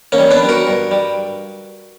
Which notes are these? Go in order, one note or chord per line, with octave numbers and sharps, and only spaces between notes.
A#3 C#4
G3
B3 D4
G3
F#4 A#4
G2
G3